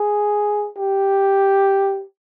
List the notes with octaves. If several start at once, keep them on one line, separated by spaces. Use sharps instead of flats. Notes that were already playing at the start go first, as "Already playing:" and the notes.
Already playing: G#4
G4